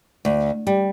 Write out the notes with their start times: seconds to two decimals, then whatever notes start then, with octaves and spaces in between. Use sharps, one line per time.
0.25 D2
0.67 G3